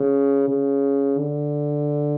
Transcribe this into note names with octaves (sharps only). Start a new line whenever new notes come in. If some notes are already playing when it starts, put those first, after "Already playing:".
Already playing: C#3
C#3
D3